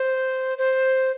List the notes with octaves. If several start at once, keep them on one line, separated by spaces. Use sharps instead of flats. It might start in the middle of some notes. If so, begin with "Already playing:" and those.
Already playing: C5
C5